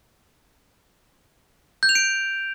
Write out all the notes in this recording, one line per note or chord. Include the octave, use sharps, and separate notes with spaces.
G6
F7
D7